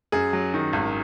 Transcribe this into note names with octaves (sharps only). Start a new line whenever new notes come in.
F#2 G#4
F#3
D#3
G#1